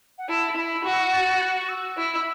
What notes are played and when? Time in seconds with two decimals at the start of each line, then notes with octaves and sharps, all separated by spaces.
0.18 F#5
0.29 E4 A5
0.56 E4 B5
0.84 F#4 C#6
0.92 E6
1.00 C#6
1.12 A6
1.41 F#6
1.58 C#6
1.69 E6
1.97 E4 E6